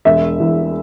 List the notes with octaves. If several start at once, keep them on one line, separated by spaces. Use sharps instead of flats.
E1 E5
E2